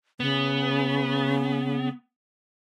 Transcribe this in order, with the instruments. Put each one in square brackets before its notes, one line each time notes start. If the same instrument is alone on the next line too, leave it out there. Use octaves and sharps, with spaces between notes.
[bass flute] C#3 [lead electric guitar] B3